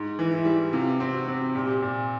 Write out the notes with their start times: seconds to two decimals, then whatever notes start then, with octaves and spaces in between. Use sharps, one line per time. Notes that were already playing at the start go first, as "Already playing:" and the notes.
Already playing: G#2
0.19 E3
0.32 E4
0.45 G3
0.73 C3 F4
1.00 C4
1.14 F#4
1.28 C4
1.55 A#2 G4
1.82 A#2